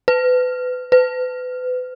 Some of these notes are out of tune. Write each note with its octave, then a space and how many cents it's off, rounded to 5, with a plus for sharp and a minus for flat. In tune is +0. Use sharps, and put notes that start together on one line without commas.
B4 +30
B4 +35